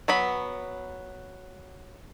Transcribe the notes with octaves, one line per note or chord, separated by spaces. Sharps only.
F#3 B3 B5